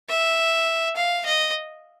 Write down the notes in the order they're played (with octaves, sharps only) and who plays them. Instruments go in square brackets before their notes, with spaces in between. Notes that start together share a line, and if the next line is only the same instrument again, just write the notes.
[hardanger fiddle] E5
F5
D#5